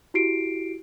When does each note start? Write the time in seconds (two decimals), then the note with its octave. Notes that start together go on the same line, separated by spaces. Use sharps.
0.14 E4 F#4 G4 C7 D7